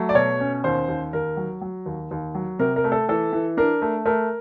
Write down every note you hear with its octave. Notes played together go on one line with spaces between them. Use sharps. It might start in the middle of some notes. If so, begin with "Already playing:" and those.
Already playing: F#3 A3
D5
B2 C#5
C#4
D#2 C5
D#2
D#2 A#4
F#3
F#3
D#2
D#2
F#3
C3 A#4
A#4
A3
A4
E3 A4
E3
D4 A#4
A3
A3 A#4